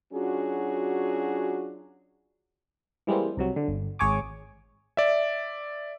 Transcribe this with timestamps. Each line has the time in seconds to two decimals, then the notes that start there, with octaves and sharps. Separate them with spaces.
0.13 F#3 C#4 D4 F4 F#4 G#4
3.07 E3 G3 G#3 A#3 C4
3.37 C2 C3 F#3
3.56 D3
3.68 G1
3.99 G#1 G#4 C#5 G#5 D6
4.97 D5 E5